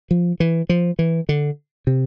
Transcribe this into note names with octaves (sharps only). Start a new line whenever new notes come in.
F3
E3
F3
E3
D3
C3